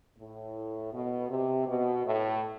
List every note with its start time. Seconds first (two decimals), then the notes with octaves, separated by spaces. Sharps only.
0.19 A2
0.93 B2
1.30 C3
1.67 B2
2.04 A2